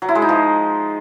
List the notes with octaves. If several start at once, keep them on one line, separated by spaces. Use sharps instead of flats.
F#3
E4
G#3
D#4
F3